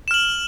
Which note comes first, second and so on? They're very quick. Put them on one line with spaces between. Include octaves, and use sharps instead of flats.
E7 F6 F#7